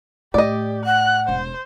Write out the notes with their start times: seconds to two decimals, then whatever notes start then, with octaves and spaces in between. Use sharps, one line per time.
0.34 A2 G4 D5 D#5
0.86 F#5 F#6
1.29 E1 C5